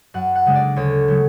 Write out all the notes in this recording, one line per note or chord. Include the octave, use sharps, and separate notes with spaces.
F#2 F#5
F#5
C#3 G#3 D4
D5
D2 C#5
C#3 F#3 A3